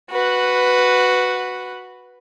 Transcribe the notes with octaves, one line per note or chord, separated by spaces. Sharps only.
F#4 B4